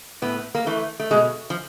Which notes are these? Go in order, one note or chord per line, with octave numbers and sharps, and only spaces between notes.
A2 B3
A#3
E3 A3
A3
B2 G#3
F3